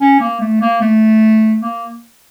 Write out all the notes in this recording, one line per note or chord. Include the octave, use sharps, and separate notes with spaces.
C#4
A#3
A3
A#3
A3
A#3